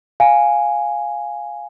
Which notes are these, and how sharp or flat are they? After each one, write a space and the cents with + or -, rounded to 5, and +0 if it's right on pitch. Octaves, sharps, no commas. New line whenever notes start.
F5 +0 G#5 +0